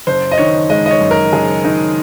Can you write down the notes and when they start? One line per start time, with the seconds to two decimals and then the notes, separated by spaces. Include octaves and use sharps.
0.07 F#1 C5
0.32 D#5
0.38 D#3 C#5
0.70 G#3 D#5
0.86 D#5
0.91 C#5
1.01 F#2
1.11 A#4
1.32 F#1 G#4
1.64 D#3 D#4